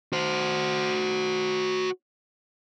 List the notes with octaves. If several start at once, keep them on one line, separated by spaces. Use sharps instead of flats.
F#4 C5